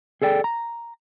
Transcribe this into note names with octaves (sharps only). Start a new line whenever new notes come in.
G#4 A4 D5 G5
A#5